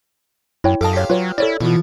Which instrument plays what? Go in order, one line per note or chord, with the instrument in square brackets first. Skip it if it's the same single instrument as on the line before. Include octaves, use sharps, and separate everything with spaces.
[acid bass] F#2 [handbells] E4 C#5 G5
[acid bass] F#2 [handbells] A4 A5 [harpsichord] D#5 F5 D6
[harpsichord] G4 C5 F5 [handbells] C#5 B6
[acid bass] F#3 [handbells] F4 B4 C#5
[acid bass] E4 [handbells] A4 C#5 D5
[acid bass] B2 [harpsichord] E3 F3